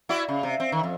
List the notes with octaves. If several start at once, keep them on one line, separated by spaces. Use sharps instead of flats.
E4 F#4 D5
C#3
C3
C4
D#3
F2